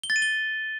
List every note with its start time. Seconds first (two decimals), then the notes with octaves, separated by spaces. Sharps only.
0.03 G7
0.10 A6
0.16 D#7
0.22 G7